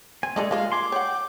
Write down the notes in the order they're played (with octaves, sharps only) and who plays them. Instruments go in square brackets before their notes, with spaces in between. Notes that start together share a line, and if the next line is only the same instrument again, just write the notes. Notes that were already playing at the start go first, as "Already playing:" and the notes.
[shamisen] C4 [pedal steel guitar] G#5
[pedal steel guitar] G#3 G#4 [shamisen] A3 D4 A4
[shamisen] F3 A#3 F4 [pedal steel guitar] G#3 [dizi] F5
[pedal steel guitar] G#5 C6 [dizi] D6
[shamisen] C#5 F#5 [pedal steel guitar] G5